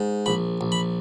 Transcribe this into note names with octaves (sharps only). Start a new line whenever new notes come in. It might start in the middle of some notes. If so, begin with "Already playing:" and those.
Already playing: G#2
A#1 B5
A#1
B5